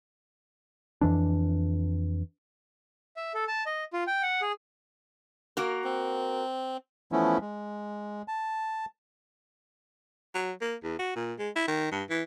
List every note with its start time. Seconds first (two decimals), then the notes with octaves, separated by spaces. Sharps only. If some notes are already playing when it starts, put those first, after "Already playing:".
1.01 F2 E3 D4
3.17 E5
3.34 A4
3.48 A5
3.66 D#5
3.93 F4
4.07 G5
4.22 F#5
4.42 G#4
5.57 A#3 F#4 A#4
5.84 C4
7.12 E3 F3 A3 B3 C#4 E4
7.41 G#3
8.28 A5
10.35 F#3
10.61 A#3
10.83 E2
10.99 F#4
11.16 A#2
11.39 G#3
11.56 E4
11.68 D#3
11.91 G2
12.10 E3